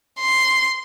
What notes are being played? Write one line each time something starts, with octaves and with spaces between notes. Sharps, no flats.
C6